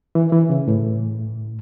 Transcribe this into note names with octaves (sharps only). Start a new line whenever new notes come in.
E3
E3
C#3
A2